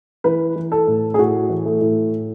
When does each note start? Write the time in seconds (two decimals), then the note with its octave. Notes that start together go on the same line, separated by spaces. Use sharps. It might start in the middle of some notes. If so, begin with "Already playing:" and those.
0.24 E3 B4
0.56 E3
0.72 A4
0.87 A2
1.14 G#4
1.19 A2 F#4
1.49 E3
1.65 A3
1.81 A2